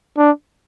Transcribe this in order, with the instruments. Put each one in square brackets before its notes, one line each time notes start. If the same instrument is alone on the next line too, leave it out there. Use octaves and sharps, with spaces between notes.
[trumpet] D4